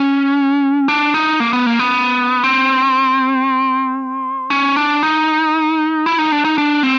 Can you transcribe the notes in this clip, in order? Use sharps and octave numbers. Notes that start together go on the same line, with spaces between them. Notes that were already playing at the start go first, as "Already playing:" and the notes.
Already playing: C#4
D4
D#4
A#3
B3
A#3
B3
C4
C#4
D4
D#4
E4
D#4
D4
D#4
D4
C4